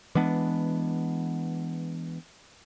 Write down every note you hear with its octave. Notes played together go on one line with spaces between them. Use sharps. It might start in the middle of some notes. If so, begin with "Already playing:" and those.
E3 G#3 B3 D4